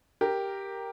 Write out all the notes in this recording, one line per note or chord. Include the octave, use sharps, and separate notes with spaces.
G4 A#4